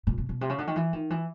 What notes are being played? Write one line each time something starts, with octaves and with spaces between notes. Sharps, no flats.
A#2
B2
B2
C3
C#3
D3
D#3
E3
D#3
E3